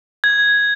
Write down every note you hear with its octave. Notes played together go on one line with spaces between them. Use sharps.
G#6